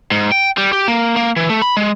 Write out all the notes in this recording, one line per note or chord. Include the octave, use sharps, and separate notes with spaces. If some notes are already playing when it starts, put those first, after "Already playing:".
G#2
G5
G3
G4
A#3
A#3
E3
A3
B5
G#3